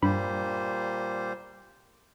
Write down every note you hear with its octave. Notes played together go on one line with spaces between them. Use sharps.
G2 A#2 G3 C5 B5